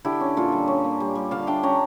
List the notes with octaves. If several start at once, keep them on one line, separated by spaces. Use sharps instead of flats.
D3 E4 G4
C#4
A#2 F4 A4
G3
C#4
A#3
G3
G3
D3 F5 A5
D4 E5 G5
C#4 G5 A#5